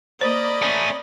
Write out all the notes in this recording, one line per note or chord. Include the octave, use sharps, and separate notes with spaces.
A#3 C5 D5 D#5 B5
A3 C#4